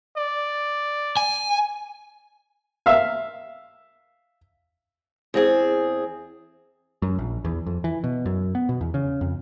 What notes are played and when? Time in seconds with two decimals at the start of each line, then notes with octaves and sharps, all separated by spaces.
0.17 D5
1.17 G#5
2.86 E5 F5
5.34 E2 C4 G#4
7.02 F#2
7.19 A#1
7.45 E2
7.66 F2
7.84 E3
8.04 B2
8.26 F#2
8.55 B3
8.69 B2
8.81 E2
8.94 C#3
9.21 F2